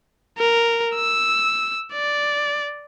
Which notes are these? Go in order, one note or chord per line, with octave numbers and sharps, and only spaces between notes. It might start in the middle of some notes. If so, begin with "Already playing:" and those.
A#4
E6
D5